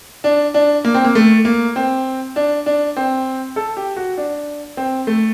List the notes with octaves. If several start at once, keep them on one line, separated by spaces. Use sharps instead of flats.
D4
D4
A#3
C4
A#3
A3
A#3
C4
D4
D4
C4
A4
G4
F#4
D4
C4
A3